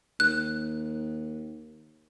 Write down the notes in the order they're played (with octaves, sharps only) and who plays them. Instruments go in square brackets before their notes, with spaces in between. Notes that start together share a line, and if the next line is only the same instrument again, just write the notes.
[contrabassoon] D#2 [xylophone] F#6